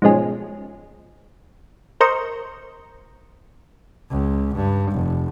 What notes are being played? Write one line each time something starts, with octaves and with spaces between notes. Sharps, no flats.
G#2 B2 F3 G#3 C#4
A#4 C5 D#5 C#6
C#2
G2
F1